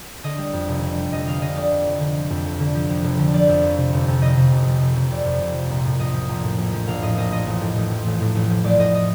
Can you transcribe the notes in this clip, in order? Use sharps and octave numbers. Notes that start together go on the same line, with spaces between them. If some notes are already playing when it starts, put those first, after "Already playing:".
D3 D#5
G3
F2
F1
D3
G3
F2 D#5
F1 F5
D3 D#5
G3 D5
F2
F1
D3
F3
F2
F1
D3
F3
F2
F1
D3
F3 D5
F2
F1
C3
F1
F2
F1 D#5
C3
F1
F2
F1
C3
F1 D5
F2
F1
F3
A#1
A2
A#1 D#5
F3
A#1
A2
A#1
F3
A#1 F5
A2 D#5
A#1 D#5
F3 D#5
A1
A2
A1
F3
A1
A2
A1
F3
A1 D5
A2 D#5
D#5